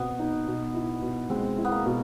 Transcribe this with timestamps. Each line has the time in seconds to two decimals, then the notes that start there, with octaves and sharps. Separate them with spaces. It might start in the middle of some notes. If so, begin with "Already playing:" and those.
Already playing: B2 B3 C4
0.19 D#4
0.47 B2
0.75 E4
1.02 B2
1.30 G#3 C4
1.58 E4
1.65 B3
1.72 A#3
1.86 B2